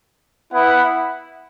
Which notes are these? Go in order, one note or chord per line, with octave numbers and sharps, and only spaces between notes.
B3 E4 B4 F#5